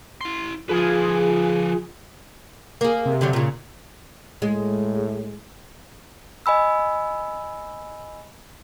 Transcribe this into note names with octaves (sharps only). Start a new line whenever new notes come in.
E4 C6
F3 F4 G#4 B4
A#3 G#4
C3
D3 F#3 G3
A#2 C#3
A2 G#3
D#5 G#5 B5 E6